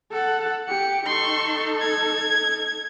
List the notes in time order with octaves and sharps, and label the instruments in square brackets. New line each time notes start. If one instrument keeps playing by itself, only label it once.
[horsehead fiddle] A4 F#5
[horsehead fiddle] G4 [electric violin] C#7
[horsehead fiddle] D#4 A4 [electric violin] C6 C#6
[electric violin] G#6